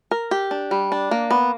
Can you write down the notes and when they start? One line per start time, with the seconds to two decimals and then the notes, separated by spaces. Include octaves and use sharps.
0.11 A#4
0.31 G4
0.51 D4
0.71 G3
0.92 D4
1.11 A#3
1.31 B3